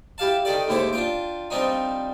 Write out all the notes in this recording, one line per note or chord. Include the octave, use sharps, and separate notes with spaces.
E4 G4 F5 A5
D#3 G4 A4 D5
D#2 G#2 E4 C5 C#5 D6
D4 F4 G5
F3 G3 C4 D4 D#4